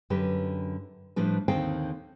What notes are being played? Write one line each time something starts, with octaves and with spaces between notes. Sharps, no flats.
F#2 D3 G4 B4
A2 F3 G3 D4 B4
D#2 D3 D#3 C4 F5 G5